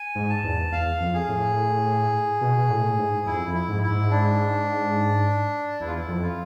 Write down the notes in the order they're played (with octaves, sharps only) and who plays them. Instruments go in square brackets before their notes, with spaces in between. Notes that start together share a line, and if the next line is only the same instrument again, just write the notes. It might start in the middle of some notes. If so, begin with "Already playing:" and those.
Already playing: [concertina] G#5
[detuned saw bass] G#2
[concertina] A5
[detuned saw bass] E2
[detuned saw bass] E2 [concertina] F5
[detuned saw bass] F2
[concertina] G#4
[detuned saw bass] A2
B2
B2
A2
G#2
[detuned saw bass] F2 [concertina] E4
[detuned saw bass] F2
[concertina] E4
[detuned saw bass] G#2
[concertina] E4
[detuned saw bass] G#2
[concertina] D4
[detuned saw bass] E2 [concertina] E4
[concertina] F4
E4
[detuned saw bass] F2
[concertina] F4